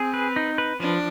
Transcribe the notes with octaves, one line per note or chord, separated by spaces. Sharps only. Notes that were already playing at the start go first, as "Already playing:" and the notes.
Already playing: C4 G#4
B4
D#4
B4
F3 D4